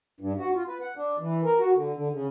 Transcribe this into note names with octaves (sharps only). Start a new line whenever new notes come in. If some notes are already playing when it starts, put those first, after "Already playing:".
G2
F#4
F4
B4
F#5
D4
E3
A#4
F#4
D3
D3
C#3